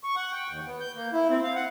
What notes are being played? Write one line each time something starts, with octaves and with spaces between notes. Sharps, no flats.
C#6
F#5
G5
D#2
B3
G6
A#3
E4
C4
F5
F#5